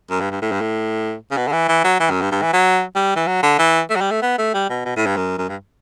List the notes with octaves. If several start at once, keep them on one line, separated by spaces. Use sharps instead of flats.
F#2
G2
G2
A2
G2
A2
C#3
B2
D3
E3
E3
F#3
E3
F#2
G2
G2
E3
F#3
G3
E3
F#3
D3
E3
A3
F#3
G3
A3
B3
A3
G3
B2
B2
A2
G2
F#2
F#2
G2